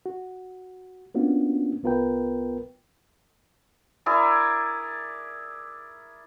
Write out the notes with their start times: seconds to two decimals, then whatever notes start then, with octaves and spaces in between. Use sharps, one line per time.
0.06 F#4
1.15 A#3 B3 C#4 D4 F4 F#4
1.83 C2 B3 F4 A#4 B4 G5
4.06 E4 G#4 A#4 D5